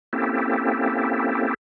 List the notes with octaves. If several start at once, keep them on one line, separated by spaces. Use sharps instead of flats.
A#3 C4 C#4 E4 G4 A4